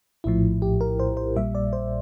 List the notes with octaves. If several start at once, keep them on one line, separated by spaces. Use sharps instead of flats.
A#1 A2 F3 E4
G4
A#4
C5
C5
A#1 A#2 G3 E5
D5
C5